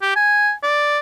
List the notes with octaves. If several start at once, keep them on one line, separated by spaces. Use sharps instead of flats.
G4
G#5
D5